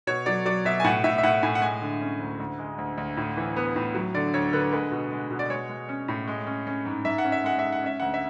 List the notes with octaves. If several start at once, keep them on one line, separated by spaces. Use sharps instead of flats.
B2 C#5
F#3 D5
F#3 D5
B2 E5
G#5
A2 F#5
A2 E5
E5
A2 F#5
A2 G#5
F#5
G#3 G#5
D3
C#4
D2
D2
G#3
D2
D2
A2
E3
B3
A2
F#3
D3 D5
D2 C#5
D3 B4
G#3 B4
B2
G#3
B2
D5
G#3 C#5
G#3
C#4
A2
G#3
C#4
C#4
G#2
G#2 E5
F#5
C#4
E5
G#3 F#5
G#2 E5
F#5
C#4 E5
D2 F#5
E5